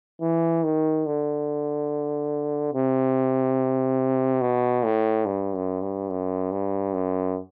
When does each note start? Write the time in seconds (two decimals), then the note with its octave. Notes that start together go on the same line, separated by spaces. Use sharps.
0.21 E3
0.64 D#3
1.06 D3
2.74 C3
4.41 B2
4.84 A2
5.26 G2
5.54 F#2
5.82 G2
6.09 F#2
6.52 G2
6.94 F#2